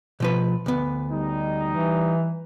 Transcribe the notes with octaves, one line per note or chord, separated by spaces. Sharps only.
B2 F3 B4
D2 B3
G3 D#4
E3